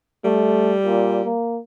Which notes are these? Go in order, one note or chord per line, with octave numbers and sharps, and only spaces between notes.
G3 A3
A#2
A#3